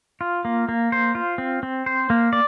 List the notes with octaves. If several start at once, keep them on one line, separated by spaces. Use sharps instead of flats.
F4
A#3
A#3
C5
F4
C4
C4
C5
A#3
D5